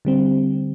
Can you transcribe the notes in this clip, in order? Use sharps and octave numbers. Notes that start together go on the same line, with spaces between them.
D3 G3 C4